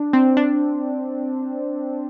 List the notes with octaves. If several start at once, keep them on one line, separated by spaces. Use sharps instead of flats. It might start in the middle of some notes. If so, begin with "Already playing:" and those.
Already playing: D4
C4
D4